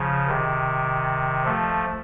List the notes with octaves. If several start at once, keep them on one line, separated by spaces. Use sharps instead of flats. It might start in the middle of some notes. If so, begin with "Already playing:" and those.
Already playing: C#3 F3
C3 D#3
F3 A3